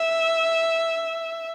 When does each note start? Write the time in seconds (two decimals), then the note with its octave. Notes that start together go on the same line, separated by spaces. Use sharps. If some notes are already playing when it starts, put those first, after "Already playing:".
Already playing: E5